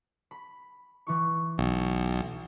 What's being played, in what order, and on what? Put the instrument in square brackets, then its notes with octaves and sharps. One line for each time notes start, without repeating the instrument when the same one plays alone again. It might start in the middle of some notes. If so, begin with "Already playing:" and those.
[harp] B5
E3 E4 C#6
[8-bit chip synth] B1